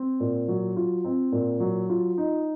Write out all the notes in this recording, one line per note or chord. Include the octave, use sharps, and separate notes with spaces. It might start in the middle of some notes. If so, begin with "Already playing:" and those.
Already playing: C4
A#2
F#3
F4
C4
A#2
F#3
F4
D#4